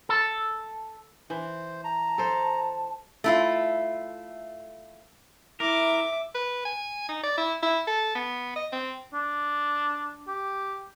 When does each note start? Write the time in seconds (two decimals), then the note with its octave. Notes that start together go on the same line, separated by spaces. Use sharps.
0.09 A4
1.30 E3 C5
1.84 A5 A#5
2.18 A4 C5
3.24 A3 E4 F4
5.60 E4 A#4 E5 D6
6.35 B4
6.65 G#5
7.09 D#4
7.23 D5
7.38 E4
7.63 E4
7.87 A4
8.15 B3
8.56 D#5
8.72 C4
9.13 D4
10.27 G4